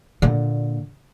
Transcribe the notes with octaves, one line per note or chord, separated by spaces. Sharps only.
A#2 D3